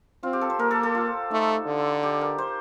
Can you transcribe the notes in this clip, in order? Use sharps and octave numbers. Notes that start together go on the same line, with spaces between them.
C4 F4
G4
A4
C5
A#3 A#4
A4
A4
F4
A3 D#4
D3
G4
A#4
C5